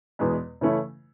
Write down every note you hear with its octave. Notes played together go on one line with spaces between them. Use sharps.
E2 B2 G#3 B3
C#3 E3 A3 C#4 E4